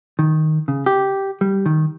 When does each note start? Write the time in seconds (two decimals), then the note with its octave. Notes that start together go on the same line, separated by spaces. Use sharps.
0.19 D#3
0.68 C#3
0.86 G4
1.41 G3
1.66 D#3